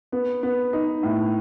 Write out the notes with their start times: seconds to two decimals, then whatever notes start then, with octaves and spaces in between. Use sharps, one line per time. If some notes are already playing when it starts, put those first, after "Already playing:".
0.12 B3
0.43 B3
0.73 D#4
1.03 A2